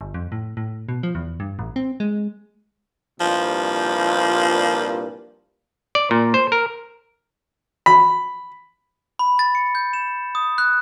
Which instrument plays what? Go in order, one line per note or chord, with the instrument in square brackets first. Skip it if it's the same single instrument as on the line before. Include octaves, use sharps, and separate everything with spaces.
[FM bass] G1
F2
A2
A2
B2
F3
E2
G2
A1
C4
G#3
[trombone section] C2 G2 A#2 [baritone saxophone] F3
[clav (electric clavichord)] D5
A#2
C5
A#4
[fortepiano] B5
[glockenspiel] B5
A6
C#7
G6
E7
D#6
F#6